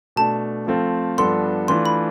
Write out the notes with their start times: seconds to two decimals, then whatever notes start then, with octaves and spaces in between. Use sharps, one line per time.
0.16 B2 A3 D4 A5
0.67 F3 A3 C4 F4 A4
1.18 G2 F3 B3 D4 A4 C6
1.68 E3 A3 D4 F4 C6
1.85 B5